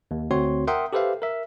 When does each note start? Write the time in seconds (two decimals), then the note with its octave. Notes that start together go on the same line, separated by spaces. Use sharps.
0.11 D#2
0.31 D2 C4 F#4 C#5 C6
0.67 A#4 E5 F#5 G5 C6 D#6
0.93 G4 A4 B4 C5 E5 F5
1.22 A#4 E5